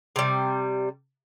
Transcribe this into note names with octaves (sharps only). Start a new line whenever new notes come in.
C3 G3